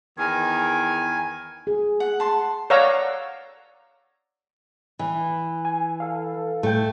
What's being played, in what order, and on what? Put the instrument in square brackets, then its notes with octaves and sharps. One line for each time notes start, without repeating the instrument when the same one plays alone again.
[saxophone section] E2 D#3 A#4 [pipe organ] G#5
[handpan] G#4
[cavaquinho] F#5
A5 C6
[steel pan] C#5 D5 F5 F#5 A#5 E6
[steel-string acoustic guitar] E3
[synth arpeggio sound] G#5
A4 F5
[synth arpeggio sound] A2 G5 [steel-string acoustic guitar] A3